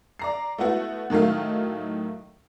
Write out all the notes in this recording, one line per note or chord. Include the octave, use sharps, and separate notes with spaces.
D5 A#5 C7
A3 B3 E4 F#4 F#5
A2 D#3 F#3 A3 F5